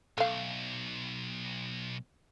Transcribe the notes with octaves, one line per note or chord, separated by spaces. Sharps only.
B1 A3 F5